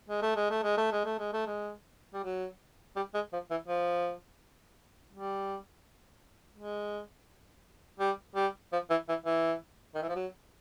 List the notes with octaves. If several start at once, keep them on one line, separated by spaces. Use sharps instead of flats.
G#3
A3
G#3
A3
G#3
A3
G#3
A3
G#3
A3
G#3
G3
F#3
G3
G#3
F3
E3
F3
G3
G#3
G3
G3
F3
E3
E3
E3
D#3
E3
F3
F#3